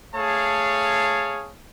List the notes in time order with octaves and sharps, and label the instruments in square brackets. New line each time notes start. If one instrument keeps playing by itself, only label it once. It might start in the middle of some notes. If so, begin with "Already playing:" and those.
[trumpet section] A3 G#4 C#5 F5 A5